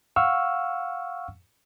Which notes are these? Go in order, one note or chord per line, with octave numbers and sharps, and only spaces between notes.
F5 F#5 C#6 E6 F6